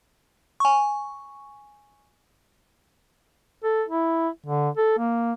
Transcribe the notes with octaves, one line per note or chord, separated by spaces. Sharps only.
G#5 C#6
A4
E4
D3
A4
A#3